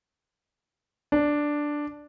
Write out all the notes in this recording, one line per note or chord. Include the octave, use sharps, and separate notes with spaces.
D4